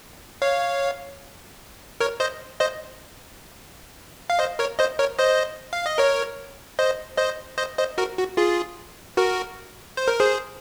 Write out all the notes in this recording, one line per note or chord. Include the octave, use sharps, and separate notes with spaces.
C#5 F5
A#4 C#5
C5 D#5
C5 D#5
F5
C5 D#5
A#4 C#5
C5 D#5
A#4 C#5
C5 D#5
F5
D#5
A#4 C#5
C5 D#5
C5 D#5
C5 D#5
C5 D#5
F#4 A#4
F#4
F4 G#4
F#4 A#4
C5
A#4
G#4 C5